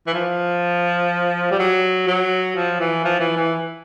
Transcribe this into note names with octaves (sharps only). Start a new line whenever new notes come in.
E3
F3
G3
F#3
F#3
F3
E3
F3
E3
E3